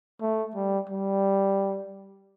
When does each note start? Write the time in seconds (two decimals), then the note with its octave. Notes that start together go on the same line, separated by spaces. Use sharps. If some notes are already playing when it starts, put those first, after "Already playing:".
0.21 A3
0.55 G3
0.89 G3